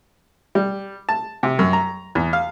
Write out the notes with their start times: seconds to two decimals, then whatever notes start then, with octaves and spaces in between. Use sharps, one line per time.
0.55 G3
1.09 A5
1.43 C3
1.59 F#2
1.73 A#5
2.15 E2
2.33 F5